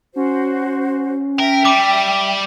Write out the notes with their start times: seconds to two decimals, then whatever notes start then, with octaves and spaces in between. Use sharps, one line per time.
0.16 C#4 F#4 C5
1.39 A#4 E5 G5
1.65 G3 D6